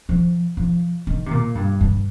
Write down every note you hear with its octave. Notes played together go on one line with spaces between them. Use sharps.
F3
F3
D#3
C3
A#2
G2
G2